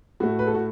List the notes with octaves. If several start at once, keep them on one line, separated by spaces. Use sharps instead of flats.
A2 A3 F#4
B4
A4
F#4